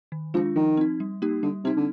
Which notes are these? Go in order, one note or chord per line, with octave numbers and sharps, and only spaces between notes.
D#3
F3 G#3 D4 F4
D#3 F3
C4 D#4
G3
A#3 D#4 G4
D3 G3
C3 C4 D#4
D3